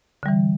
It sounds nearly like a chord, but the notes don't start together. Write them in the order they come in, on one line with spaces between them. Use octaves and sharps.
D3 G3 E3